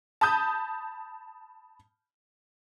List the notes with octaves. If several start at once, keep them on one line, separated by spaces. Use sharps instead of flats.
A5 B5 D#6 G6